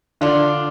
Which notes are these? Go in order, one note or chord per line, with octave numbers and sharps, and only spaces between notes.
D3 D4 F4